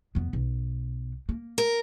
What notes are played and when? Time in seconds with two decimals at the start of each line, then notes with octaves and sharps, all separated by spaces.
0.15 F2 B3
0.33 B1
1.29 A#3
1.58 A#4